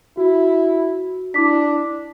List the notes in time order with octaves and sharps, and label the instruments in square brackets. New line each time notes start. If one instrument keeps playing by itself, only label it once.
[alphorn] E4 [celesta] F#4
[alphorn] D4 [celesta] E4 D6 B6